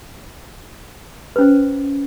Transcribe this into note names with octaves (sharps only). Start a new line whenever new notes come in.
C#4 B4 C5